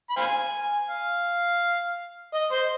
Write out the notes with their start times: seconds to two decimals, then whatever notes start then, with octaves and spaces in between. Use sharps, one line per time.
0.10 B5
0.17 C5 F5 G#5
0.89 F5
2.34 D#5
2.52 C5